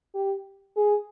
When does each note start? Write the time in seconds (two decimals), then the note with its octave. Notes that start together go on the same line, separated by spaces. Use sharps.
0.15 G4
0.77 G#4